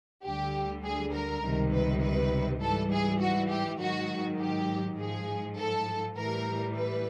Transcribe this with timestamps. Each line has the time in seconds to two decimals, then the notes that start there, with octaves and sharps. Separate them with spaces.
0.24 D2 D3 G3 G4
0.84 G#4
1.13 A#4
1.43 C#2 C3 D#3 G3
1.73 B4
2.02 B4
2.61 G#2 E3 G3 A4
2.91 G#4
3.20 F#4
3.50 G4
3.80 G#2 D#3 F#3 F#4
4.39 G4
4.98 G#2 F3 G#4
5.58 A4
6.17 A2 E3 G3 A#4
6.76 B4